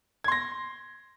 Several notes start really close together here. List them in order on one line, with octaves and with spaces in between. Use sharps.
G#6 C6 A#6